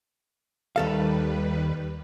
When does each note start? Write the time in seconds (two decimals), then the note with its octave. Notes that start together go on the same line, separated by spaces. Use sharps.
0.76 D#2 D#3 G3 A4 B4 F5